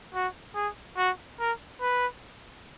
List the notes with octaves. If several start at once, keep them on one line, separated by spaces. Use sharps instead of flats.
F#4
G#4
F#4
A#4
B4